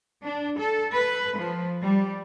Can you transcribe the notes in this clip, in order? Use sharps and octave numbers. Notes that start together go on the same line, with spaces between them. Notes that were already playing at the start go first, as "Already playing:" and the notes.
D4
A4
B4
F3
G3